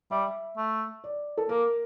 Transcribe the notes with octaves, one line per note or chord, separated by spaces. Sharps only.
G3 E5
A3
D5
A4
A#3 A#4